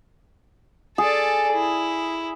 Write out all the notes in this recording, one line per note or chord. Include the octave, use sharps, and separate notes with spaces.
G#4 A4 D5
E4